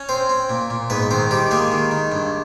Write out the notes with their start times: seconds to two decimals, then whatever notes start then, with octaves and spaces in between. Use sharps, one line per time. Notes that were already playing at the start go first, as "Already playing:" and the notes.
Already playing: C#4
0.09 C4 C5
0.29 C4
0.50 A#2
0.70 A#2
0.90 G#2 B3 B4
1.11 D#3 C4 C5
1.31 D#3 G3 G4
1.51 G#3 A#3 G#4
1.71 D#3
1.91 D#3
2.12 G2